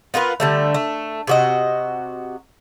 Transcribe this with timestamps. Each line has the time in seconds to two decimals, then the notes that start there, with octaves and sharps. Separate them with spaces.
0.14 B3 F4 A#4 B4
0.40 D3 G3 A3
0.74 A3
1.27 C3 F#4 D#5